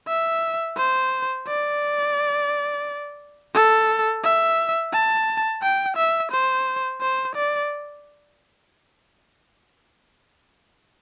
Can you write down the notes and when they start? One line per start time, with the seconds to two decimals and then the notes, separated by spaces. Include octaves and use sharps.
0.08 E5
0.77 C5
1.47 D5
3.54 A4
4.24 E5
4.93 A5
5.62 G5
5.96 E5
6.31 C5
7.01 C5
7.35 D5